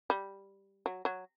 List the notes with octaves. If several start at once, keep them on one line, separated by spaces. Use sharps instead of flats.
G3
F#3
F#3